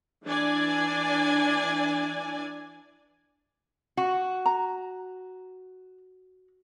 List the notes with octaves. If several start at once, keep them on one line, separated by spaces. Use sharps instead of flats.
E3 D4 D5 G#5
F#4
A#5